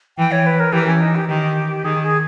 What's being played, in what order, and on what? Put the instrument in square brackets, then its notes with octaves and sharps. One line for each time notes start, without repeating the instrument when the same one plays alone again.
[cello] E3 [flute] G5
[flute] C#5
B4
A#4
[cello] E3 [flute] G4
[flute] C#4
D#4
G4
[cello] D#3 [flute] G4
[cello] D#3 [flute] G#4
[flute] G#4